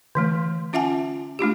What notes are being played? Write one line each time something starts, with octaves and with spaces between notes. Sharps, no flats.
D3 E3 A3
C#4 F4 E5 F#5 G#5 A5
A3 D4 F4 G4